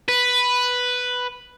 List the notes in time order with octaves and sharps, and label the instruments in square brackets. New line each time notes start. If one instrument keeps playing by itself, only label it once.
[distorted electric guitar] B4